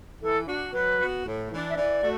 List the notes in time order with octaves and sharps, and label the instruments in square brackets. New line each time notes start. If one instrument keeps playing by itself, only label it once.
[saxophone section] E3 [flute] A4
[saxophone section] D4 F#4
[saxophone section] F#3 [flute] B4
[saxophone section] B3 F#4
A2
E3 D4
[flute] E5
[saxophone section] E3 [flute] D5
[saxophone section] A3 F#4